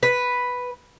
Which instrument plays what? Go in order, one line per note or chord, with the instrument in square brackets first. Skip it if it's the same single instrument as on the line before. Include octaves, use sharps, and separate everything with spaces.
[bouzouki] B4